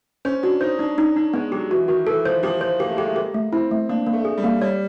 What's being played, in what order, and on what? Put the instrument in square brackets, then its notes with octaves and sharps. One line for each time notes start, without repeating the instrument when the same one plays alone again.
[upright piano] C#4 [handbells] C5
[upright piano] D4 [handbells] F#4
[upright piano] D#4 [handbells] C5
[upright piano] D4 [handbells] D#4
[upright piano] C#4 [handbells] D#4
[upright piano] D4 [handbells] D#4
[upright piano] G#3 [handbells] B3
[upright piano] F#3 [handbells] G4
[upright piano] E3 [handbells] F#4
[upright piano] D#3 [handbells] F#4
[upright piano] E3 [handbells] A4
[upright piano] F3 [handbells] C5
[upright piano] F3 [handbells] G4
[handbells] C5
[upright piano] A#3 [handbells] G4
[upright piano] A3
[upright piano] G#3 [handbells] G4
[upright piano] A3
[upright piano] A#3 [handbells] G4
[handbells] A3
[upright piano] C4 [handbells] E4
[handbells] A3
[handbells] A#3 [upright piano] D4
[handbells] A#3
[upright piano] A3
[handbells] G#4
[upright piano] G3
[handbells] A#3
[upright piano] G3 [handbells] C#5